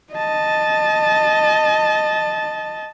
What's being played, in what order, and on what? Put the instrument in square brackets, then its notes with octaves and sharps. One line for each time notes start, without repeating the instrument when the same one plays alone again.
[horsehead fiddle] D#5 A5